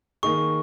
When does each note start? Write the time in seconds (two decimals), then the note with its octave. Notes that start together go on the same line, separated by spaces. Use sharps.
0.23 D#3 A#3 D#4 G#4 C#6